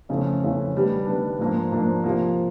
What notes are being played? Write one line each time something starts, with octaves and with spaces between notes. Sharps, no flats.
F2 C#3 E3 A3 C#4
F2 C#3 E3 A3 C#4
D#3 G3 B3 D4
D#3 G3 B3 D4
G#2 F3 A#3 D4
G#2 F3 A#3 D4
C3 F3 A#3